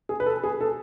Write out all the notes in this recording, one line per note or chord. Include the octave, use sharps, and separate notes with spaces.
G#4
B4
A4
G#4
A4